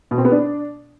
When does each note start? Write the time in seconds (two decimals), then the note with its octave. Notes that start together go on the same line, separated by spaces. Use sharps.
0.11 B2
0.18 C4
0.25 B3
0.32 D4